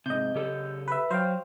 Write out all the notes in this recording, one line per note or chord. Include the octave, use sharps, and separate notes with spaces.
G#2 C3 D#5 G6
C#3 G4 A4
B4 E5
F#3 C5 F5 G5